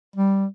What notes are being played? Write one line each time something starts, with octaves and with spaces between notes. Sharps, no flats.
G3